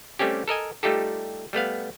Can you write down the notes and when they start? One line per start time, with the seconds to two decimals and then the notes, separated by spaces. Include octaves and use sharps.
0.19 G3 A3 C4 C#4 G4
0.48 A4 A#4 D#5 G#5
0.83 G3 A3 D#4 F4 G4 A4
1.53 G3 A3 B3 F5